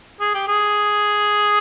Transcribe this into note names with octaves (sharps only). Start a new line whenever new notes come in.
G#4
G4
G#4